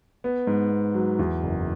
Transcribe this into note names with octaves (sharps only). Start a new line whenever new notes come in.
B3
G#2
B3
F#3
E2
F#1